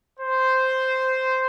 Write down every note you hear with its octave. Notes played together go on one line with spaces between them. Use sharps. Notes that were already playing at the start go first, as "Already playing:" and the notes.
C5